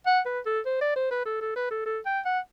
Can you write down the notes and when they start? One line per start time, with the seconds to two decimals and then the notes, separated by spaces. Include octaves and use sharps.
0.06 F#5
0.26 B4
0.46 A4
0.66 C5
0.81 D5
0.96 C5
1.11 B4
1.26 A4
1.41 A4
1.56 B4
1.71 A4
1.86 A4
2.06 G5
2.25 F#5